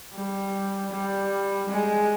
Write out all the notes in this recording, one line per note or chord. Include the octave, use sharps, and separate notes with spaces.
G3
G3
G#3